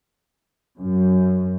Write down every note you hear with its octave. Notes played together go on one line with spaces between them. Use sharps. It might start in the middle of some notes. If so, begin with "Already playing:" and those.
F#2